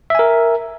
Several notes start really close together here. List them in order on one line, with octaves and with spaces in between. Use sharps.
E5 G#5 A#4